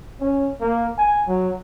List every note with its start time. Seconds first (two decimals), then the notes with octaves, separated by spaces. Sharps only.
0.20 C#4
0.60 A#3
0.98 G#5
1.27 F#3